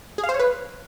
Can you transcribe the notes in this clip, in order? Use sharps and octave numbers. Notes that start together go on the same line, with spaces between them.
G#4
F5
C5
C#5
B4